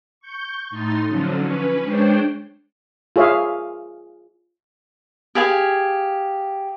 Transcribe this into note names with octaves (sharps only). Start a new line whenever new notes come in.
C#6 G6
A2 D#4 C6 A6
D3 F3 F#3 C#4
C#4 B4
G#3 D4 C5 C#5 G5
F4 G#4 C#5 E5 F5
G4 G#4 F5 G#5